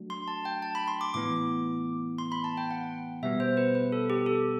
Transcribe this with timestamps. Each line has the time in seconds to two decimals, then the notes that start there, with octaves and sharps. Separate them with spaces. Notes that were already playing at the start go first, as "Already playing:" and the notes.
Already playing: F#3 A3 D4 F#4
0.10 C6
0.28 A5
0.45 G5
0.62 A5
0.75 B5
0.88 C6
1.01 D6
1.14 A2 E3 B3 D6
2.18 C6
2.32 B5
2.44 A5
2.57 G5
2.71 F#5
3.23 B2 G3 B3 E5
3.40 C5
3.57 B4
3.75 B4
3.92 A4
4.10 G4
4.26 A4